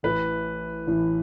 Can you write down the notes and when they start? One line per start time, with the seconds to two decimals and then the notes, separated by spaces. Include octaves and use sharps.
0.03 A1 A2 E3 B4
0.87 A1 A2 E3